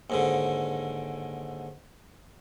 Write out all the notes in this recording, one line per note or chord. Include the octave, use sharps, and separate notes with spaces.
D#2 G#2 D3